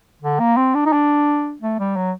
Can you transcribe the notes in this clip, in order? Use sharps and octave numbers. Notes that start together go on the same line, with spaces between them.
D3
A#3
C4
D4
D#4
D4
A3
G3
F#3